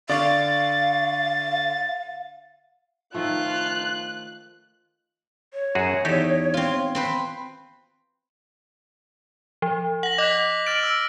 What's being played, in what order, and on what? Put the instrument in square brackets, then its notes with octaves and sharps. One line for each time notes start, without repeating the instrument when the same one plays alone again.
[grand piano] D3 D5 C#6 [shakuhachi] F5 [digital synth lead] A6
[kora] D#3 F3 A3 [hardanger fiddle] F4 [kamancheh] F#6
[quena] C#5
[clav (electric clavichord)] F#2 F#4 G#4
[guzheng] E2 [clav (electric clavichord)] D#4 G4 A4
[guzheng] C4 F4
C4 B4 C5
[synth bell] F3
[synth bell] F#5 [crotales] A#6 F#7
[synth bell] D#5 [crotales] D6 F#6 B6
[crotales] F6 A6 F#7 [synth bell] D7
[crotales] E6